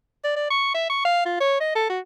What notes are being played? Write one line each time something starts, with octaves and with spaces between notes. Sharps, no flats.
D5
D5
C#6
E5
C#6
F5
F4
C#5
D#5
A4
F#4